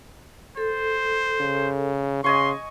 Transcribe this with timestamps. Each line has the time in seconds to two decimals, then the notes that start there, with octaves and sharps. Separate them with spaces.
0.57 A4 C5
1.41 C#3
2.24 C#3 D#5 G#5 C6 C#6